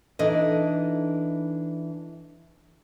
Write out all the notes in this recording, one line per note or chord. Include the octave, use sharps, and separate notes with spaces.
E3 D4 D#4 A4 D#5